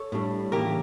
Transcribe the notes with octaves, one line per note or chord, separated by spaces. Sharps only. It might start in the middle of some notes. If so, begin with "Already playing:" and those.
Already playing: A4 C#5
A2 G3 D4
C#3 E3 A#3 G4 A#4